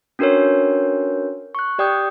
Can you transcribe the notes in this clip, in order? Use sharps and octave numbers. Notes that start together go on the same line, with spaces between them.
C#4 D4 F#4 A#4 B4 C#5
C#6 F#6
G4 D5 G5 D#6 G6